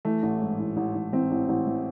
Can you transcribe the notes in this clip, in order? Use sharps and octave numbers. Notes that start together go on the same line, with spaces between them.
E3 A3
A1
G#2
A1
A1
A1
E3 C4
A1
A1
E3